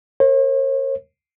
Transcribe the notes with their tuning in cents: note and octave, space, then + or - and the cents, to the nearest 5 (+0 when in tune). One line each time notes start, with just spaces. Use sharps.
A#4 +0 C#5 -45